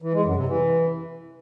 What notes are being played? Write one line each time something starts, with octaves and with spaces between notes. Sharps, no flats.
E3
G#3
F#2
C3
E3